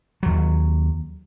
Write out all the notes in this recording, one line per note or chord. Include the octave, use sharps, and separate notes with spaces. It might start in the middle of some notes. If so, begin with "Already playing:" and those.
D#2 F#3